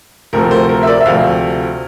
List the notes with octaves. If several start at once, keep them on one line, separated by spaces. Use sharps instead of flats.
D2 C3 F3 A3 A#4
C5
A#4
E5
D5
E5
D2 C3 F3 A3 F5